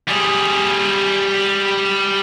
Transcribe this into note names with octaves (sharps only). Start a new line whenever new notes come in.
G3 G#4